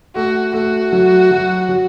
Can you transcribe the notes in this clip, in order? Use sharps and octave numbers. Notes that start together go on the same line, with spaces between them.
A3 F#4
A3 F#4
F#3
F#3
F#3